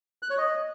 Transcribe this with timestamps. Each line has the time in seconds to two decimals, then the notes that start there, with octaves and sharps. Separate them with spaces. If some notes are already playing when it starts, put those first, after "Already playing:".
0.23 F#6
0.30 C#5
0.38 D#5